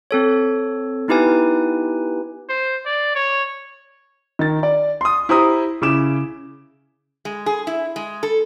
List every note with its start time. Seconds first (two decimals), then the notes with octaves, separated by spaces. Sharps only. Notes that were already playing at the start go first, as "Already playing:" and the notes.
0.11 C4 A4 C#5
1.08 B3 D#4 E4 G4 B4 G#5
2.49 C5
2.86 D5
3.15 C#5
4.39 D#3 A6
4.63 D5
5.01 C6 D#6
5.29 E4 G4 C5 A#5 D#6
5.82 C#3 E4 D6 E7
7.25 G#3
7.46 G#4
7.67 E4
7.96 G#3
8.23 A4